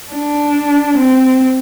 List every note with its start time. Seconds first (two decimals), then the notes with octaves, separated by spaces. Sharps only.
0.12 D4
0.97 C4